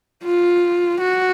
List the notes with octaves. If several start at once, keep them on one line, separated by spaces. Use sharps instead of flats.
F4
F#4